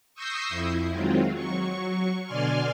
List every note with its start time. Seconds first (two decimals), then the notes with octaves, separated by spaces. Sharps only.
0.14 C#6 D#6 E6 G6 A#6 C7
0.49 F2 E4
0.91 D#3 F#3 G#3 C4 F4
1.33 F#3 C#6
2.25 B2 D3 D5 G#5 C6 F6